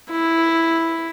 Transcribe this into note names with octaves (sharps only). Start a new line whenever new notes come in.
E4